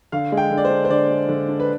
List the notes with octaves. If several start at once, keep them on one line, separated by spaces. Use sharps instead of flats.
D3 F5
G#3
G5
D3
D5
C5
D4
C5
D3 D5
G#3
D3
D4
B4